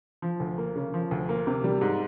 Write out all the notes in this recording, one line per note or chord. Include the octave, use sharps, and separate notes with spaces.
F3
D2
A#3
C#3
F3
D2
A#3
C3
G3
G#2